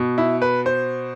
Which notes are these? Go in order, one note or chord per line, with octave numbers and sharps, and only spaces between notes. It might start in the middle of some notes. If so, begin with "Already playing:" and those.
Already playing: B2
E4
B4
C5